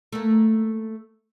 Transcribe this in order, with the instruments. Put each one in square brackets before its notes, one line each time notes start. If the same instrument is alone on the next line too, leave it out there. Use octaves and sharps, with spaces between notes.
[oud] A3 A#3